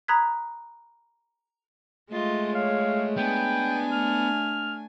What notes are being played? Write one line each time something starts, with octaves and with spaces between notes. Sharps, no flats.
A#5 B5 D#6 F#6 G#6 B6
G#3 A3 F4 D#5
C#5 F5
B3 D4 G5 G#5
A3 F6